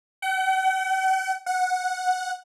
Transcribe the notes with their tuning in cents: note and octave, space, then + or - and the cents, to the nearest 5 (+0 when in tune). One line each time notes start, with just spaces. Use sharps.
F#5 +45
F#5 -10